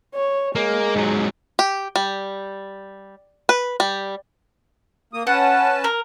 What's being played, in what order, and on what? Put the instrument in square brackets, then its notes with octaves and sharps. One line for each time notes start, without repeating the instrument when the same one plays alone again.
[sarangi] C#5
[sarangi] G#3 [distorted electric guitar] A#3
[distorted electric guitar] G#2 F#3
[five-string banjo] G4
G3
B4
G3
[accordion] A#3 D#6
[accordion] C#4 B4 A5 [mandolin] F#5
[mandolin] A#4